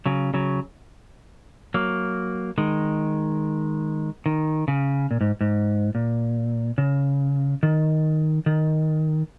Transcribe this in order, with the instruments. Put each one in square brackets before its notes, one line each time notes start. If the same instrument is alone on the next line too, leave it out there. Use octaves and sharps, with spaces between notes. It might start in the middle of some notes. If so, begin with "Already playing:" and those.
[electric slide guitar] C#3 F#3
C#3 F#3
F#3 A#3
D#3 G#3
D#3
C#3
A#2
G#2
G#2
A#2
C#3
D#3
D#3